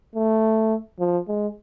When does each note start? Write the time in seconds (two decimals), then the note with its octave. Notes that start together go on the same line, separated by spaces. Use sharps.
0.15 A3
0.99 F3
1.28 G#3